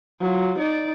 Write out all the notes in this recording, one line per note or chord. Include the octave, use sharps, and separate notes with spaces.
F#3 F4
D#4 D5